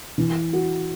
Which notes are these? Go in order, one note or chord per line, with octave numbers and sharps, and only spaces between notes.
E3
F#4